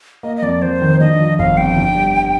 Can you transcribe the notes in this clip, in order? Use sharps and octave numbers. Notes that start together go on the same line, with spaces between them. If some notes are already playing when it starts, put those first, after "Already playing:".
A#3 D#5
D#5
F2 D5
F2 C5
D#3
D3 D#5
F3
G1 F5
F2 G5
D3
G3